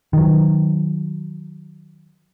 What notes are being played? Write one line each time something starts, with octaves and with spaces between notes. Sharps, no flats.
D#3 F#3